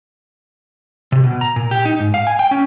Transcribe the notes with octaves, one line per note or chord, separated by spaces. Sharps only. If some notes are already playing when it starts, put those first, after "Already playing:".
C3
B2
A#5
A#2
G4
D#4
G#2
F5
G#5
G5
C#4